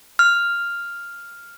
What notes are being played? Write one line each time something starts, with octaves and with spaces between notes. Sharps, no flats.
F6